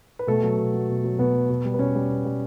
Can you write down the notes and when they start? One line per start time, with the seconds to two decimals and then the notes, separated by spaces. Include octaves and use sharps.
0.19 B4
0.27 B2 A3 A4
0.43 F#3
0.58 B2
0.74 F#3
0.89 B2
1.04 F#3
1.18 B2 B3 B4
1.34 F#3
1.50 B2
1.65 G3
1.74 B4
1.79 B2 C#4 C#5
1.95 G3
2.10 B2
2.25 G3